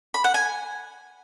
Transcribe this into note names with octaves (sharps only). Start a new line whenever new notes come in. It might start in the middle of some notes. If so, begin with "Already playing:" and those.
B5
F#5
G#5